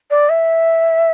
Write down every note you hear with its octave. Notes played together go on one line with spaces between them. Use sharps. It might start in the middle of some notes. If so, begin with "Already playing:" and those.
D5
E5